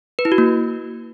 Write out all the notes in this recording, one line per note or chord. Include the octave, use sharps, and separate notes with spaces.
B4
E4
F#4
A#3